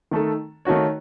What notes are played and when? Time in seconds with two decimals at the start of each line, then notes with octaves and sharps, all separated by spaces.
0.11 D#3 A3 D#4 A4
0.65 D#3 A3 D#4 F#4 C#5